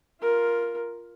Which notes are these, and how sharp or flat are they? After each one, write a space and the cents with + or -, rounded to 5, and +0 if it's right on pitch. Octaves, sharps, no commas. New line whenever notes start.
F4 +0 A#4 +10